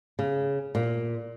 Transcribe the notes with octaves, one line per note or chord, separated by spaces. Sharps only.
C#3
A#2